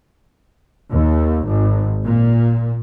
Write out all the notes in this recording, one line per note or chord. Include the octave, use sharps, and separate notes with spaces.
D#2
G#1
A#2